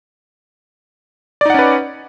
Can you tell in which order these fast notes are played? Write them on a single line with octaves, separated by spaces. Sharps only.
D5 D#4 F#5 C#4 B4